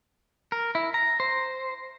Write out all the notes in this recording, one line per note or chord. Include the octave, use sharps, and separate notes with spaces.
A#4
E4
A#5
C5